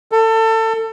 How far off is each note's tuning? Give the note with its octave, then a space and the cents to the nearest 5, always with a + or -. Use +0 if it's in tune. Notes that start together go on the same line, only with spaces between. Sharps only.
A4 +25